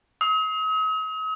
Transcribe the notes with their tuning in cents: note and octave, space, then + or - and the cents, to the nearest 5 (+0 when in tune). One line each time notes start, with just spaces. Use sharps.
D#6 +45